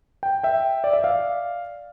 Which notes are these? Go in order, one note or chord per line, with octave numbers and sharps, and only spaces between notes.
G5
E5 G5
D5
E5
D5 F5